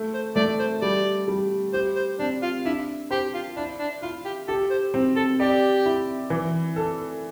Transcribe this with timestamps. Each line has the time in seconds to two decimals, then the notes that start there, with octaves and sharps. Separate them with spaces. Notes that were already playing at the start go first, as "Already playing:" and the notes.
Already playing: A3
0.14 C5
0.36 A3 D5
0.59 C5
0.82 G3 D5
1.28 G3
1.73 G4 C5
1.96 C5
2.19 C4 D4
2.42 F4
2.65 D4 E4
3.11 G4 C5
3.34 F4
3.56 D4 E4
3.79 D4
4.02 E4 F4
4.25 G4
4.48 G4 A4
4.70 C5
4.94 C4
5.16 A4
5.40 G4 D5
5.86 E4
6.30 E3
6.76 A4